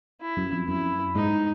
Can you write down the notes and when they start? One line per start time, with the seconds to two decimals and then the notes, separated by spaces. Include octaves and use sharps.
0.21 E4
0.37 F#2
0.52 F2
0.68 F#2 E4
1.15 G#2 D#4